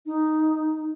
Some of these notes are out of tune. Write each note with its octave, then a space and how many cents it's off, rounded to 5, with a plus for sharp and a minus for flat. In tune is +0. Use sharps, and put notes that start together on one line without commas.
D#4 +0